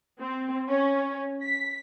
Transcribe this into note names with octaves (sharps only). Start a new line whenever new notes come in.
C4
C#4
B6